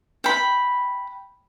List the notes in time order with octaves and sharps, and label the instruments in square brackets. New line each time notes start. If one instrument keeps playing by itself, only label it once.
[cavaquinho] G5 B5